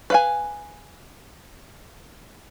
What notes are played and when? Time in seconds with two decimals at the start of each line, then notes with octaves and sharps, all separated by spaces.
0.10 B4 F5 G#5